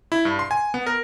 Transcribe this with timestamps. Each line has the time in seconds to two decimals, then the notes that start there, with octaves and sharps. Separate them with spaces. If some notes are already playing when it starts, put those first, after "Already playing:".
0.12 E4
0.25 G2
0.39 C6
0.51 G#5
0.74 B3
0.86 A#4